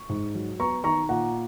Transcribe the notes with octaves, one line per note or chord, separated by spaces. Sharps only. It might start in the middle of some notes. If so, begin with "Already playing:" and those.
Already playing: C#6
G#2
F#3
B3 A#5 C#6
D#3 A#5 C#6
A#2 F#5 A#5